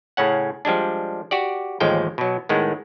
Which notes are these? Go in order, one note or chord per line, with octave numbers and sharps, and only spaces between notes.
A2 C#3 C#4 F#5
F3 G3 G#3 D4
F#4 G4 D5
A1 D#2 F3 G#3 G5
B2 F#3
A2 D#3 G#3 B3